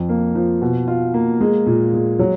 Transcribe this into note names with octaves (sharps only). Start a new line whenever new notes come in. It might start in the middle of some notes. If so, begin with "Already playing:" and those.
Already playing: F2
A#3
F3
B2
F4
A#3
G#3
A#2
G#3
F#3